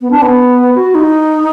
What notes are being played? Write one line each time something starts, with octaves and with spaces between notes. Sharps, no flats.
B3
D4
B3
F#4
D#4